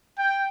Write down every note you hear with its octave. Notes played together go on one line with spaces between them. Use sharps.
G5